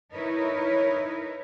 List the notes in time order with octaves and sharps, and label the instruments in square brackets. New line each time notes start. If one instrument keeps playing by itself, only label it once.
[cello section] D#4 E4 A#4 B4 C#5